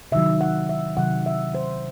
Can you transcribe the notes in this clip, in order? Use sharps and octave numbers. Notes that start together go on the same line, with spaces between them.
C3 D#3 F#3 E5
F#5
E5
C3 D#3 F#3 F#5
E5
C5